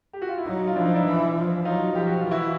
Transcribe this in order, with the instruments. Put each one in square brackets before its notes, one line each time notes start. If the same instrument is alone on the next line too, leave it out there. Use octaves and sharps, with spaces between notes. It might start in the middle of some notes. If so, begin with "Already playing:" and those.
[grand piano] G4
F#4
F4
E4
[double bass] F#3 [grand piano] D#4
[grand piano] F4
[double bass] F3 [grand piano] D4 E4
[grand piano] D#4
D4 E4
[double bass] E3
F3
[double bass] F#3 [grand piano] D#4 F4
[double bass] F3 [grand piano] G4
[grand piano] F#4
F4
[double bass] E3
[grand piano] E4 F#4